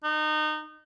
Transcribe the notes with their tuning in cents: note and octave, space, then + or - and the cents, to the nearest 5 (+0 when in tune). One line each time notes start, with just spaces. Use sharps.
D#4 -25